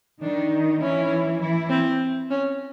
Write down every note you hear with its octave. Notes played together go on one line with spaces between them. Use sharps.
D#3 D4 D#4
E3 C#4 E4
E3 E4
C4
C#4